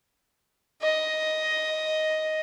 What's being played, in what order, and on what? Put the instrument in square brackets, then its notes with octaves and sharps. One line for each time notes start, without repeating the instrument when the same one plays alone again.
[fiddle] D#5